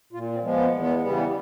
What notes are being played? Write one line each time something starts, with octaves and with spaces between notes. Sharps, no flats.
A#2 F4
C4
F3 G#3 B3
B3
E2
B3
C#3 E3 G3 B3